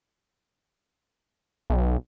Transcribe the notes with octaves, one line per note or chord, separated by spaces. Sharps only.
B1